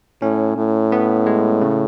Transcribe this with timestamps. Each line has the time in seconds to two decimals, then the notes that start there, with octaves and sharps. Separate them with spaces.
0.22 A2 C#4
0.57 A2
0.92 B3
1.26 G#3
1.61 C#3